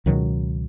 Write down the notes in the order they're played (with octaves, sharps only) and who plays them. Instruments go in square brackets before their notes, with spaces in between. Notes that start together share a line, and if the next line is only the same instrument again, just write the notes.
[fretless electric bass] C#2 B2 D#3 F#3